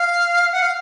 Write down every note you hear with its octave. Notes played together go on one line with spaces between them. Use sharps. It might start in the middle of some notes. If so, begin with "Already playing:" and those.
Already playing: F5
F#5
F5